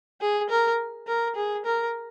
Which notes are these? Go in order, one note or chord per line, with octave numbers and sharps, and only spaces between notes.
G#4
A#4
A#4
G#4
A#4